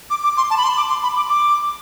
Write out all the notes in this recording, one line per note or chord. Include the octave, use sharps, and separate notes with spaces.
D6
D6
C6
A5
B5
C6
D6
C6
B5
D6
D6